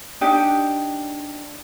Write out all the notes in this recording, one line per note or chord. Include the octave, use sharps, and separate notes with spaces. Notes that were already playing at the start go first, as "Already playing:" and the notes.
D4 D#4 G4